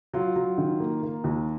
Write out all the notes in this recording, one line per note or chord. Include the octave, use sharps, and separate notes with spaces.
F#3 F4
F#3
D#3
A#3
A#3
D#2